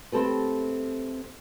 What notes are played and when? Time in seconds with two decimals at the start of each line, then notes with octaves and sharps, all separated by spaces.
0.12 A3 C4 G4 A4 B4